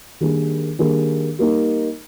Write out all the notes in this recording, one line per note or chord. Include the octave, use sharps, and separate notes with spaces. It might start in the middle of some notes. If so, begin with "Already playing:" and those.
D#3 G3 A#3 D4 G#4
D#3 G3 A#3 D4 G#4
G3 A#3 D#4